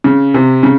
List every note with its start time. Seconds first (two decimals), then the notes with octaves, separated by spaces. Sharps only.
0.04 C#3
0.34 C3
0.63 C#3